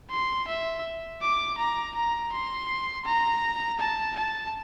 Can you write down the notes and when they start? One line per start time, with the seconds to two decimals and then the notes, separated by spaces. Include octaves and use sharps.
0.11 C6
0.48 E5
1.21 D6
1.58 A#5
1.95 A#5
2.32 C6
3.05 A#5
3.79 A5
4.16 A5